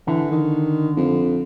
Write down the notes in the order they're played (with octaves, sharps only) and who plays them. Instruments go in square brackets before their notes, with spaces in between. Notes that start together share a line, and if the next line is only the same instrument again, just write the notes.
[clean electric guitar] D3 [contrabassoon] E3
[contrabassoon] D#3
F2